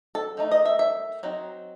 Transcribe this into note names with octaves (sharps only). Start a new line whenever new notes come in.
A4
D#3 A3 D#4
D#5
E5
E5
F#3 C4 D#4